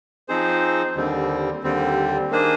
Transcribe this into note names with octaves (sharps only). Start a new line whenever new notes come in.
F3 C4 D#4 G#4 C5
D#2 D3 G3 C4
D#2 D3 G3 C4
D#3 A#3 D4 G#4 C5